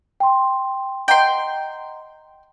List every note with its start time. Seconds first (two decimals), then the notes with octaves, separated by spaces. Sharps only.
0.20 G5 C6
1.08 D#5 F#5 G5 A#5 C6